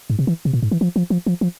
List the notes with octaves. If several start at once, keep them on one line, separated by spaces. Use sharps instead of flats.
G#2
C3
E3
C3
A#2
G#2
E3
F3
F3
F3
F3
F3